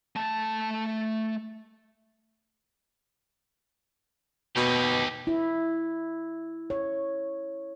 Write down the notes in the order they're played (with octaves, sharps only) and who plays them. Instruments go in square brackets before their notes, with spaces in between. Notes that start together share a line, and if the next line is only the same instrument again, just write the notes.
[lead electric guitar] A3 A5
[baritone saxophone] B2 [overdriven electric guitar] D#4 G4
[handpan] E4
C#5